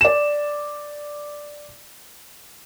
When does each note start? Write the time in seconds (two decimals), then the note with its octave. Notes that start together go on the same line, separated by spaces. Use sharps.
0.01 D5 E7